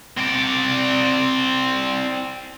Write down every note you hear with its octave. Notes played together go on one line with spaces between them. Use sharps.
C4 D5